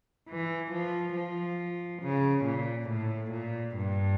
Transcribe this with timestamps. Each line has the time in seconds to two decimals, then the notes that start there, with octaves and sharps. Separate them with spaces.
0.28 E3
0.71 F3
1.14 F3
2.02 C#3
2.45 A#2
2.89 A2
3.32 A#2
3.75 G2